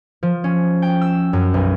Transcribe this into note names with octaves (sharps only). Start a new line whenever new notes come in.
F3
C#4
G5
E6
F#2
B1